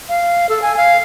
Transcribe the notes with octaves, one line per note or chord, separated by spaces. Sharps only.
F5
A4
G#5
F5